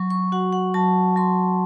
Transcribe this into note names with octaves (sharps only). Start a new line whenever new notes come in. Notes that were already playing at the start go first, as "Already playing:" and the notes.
Already playing: F#3 C#6
C#6
F#4 F#5
F#5
F#3 A5
F#3 C6